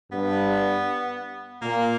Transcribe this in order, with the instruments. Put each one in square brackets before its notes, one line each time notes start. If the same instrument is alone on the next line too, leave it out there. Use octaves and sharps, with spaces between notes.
[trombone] G2 [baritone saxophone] B3
[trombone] A#2 [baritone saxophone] A#3